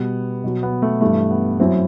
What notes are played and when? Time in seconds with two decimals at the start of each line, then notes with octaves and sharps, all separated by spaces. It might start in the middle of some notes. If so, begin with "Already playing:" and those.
Already playing: B2 G3 B3
0.44 B2 F#3
0.63 B3
0.82 A3
1.01 G2 E3 G3 A3
1.31 B3
1.60 F#2 F#3 C4 E4